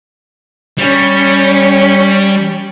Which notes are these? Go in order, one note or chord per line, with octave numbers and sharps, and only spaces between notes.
G3 C#4